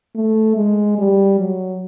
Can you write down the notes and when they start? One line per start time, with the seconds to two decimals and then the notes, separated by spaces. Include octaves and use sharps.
0.15 A3
0.56 G#3
0.98 G3
1.39 F#3